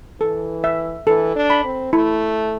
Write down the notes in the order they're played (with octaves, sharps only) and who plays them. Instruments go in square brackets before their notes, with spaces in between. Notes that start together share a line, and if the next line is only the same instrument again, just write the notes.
[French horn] E3 [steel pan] A4
[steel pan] E5
[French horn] E3 [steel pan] A4
[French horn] D4
[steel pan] B5
[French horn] C4
[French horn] A3 [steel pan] E4